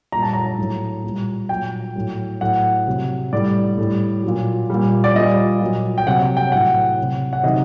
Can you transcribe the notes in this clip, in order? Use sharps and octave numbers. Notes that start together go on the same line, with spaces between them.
A#2 G3 A#5
A5
A#5
A2 F#3
A#2 G3
A#2 F#3 G5
A2 F#3
A2 F#3 F#5
C3 F#3
A2 G3 D5
A2 G3
A#2 F#3
A#2 G3
D5
A#2 G3 D#5
A#2 F#3
G5
C3 F#3 F#5
F#5
G5
A2 F#3 F#5
C3 F#3
F#5
C3 D#3 F#3 D#5